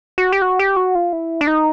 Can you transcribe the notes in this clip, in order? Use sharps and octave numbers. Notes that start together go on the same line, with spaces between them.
F#4
G4
F#4
G4
F#4
F4
E4
D4
D#4